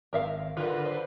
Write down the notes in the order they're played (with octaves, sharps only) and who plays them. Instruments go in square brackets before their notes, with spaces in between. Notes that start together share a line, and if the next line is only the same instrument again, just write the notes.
[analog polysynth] G#1 [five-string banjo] A#4 E5 F5
[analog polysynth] D3 B4 [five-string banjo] F4 A#4
[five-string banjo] C5